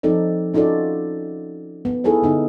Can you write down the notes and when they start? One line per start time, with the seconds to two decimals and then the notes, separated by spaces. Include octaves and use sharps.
0.03 F3 C4 D#4 A4 D5
0.54 C#4 D#4 F4 F#4 A4 D5
1.85 B3
2.04 D#4 E4 G#4 A4 B4 C#5
2.22 D3 B3 D#4